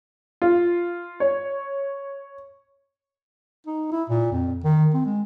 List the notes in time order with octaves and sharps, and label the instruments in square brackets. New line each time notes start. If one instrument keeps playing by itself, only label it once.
[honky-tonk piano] F4
C#5
[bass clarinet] D#4
E4
A#2
F2
D#3
C4
G#3